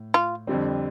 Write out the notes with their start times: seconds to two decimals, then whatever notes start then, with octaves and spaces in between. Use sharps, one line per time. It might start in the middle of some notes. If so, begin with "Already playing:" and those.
Already playing: A2
0.14 F4
0.47 F2 D3 G3 C4